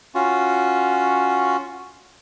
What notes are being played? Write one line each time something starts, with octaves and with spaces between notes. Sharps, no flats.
C#4 F4 F#4